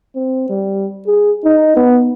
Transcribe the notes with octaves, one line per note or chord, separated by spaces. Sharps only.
C4
G3
G#4
D#4
B3